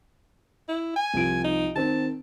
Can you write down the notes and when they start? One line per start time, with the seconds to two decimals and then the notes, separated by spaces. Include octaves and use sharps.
0.69 E4
0.96 G#5
1.14 C2 F3 D7
1.44 D#4
1.76 D#3 C4 A5